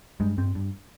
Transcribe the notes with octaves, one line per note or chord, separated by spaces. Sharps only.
G2 G#3
G2 C4
G2